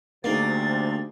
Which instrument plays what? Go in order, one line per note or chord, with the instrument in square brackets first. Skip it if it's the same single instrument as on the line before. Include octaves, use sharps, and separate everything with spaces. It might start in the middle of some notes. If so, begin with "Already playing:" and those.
[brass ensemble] D2 C3 [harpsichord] A#3 [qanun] D#4 G#4 D5 [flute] A6